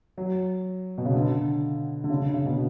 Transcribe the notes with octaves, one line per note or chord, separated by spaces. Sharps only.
F#3
B2
C#3
D3
D3
C#3
D3
C#3
B2